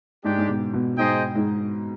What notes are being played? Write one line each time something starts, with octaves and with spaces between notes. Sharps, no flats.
G#2 G#3 D4 G4
G#2
B2
B2
G#2 D#4 G#4 C5 D#5 G5
G#2